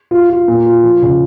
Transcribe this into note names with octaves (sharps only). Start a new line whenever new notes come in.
F4
F4
A#2
F4
F3
C#3